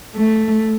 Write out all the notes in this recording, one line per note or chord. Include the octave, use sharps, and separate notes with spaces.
A3